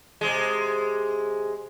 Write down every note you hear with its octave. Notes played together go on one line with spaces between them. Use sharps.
C3 G#3